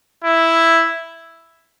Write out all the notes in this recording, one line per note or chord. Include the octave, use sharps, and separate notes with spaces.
E4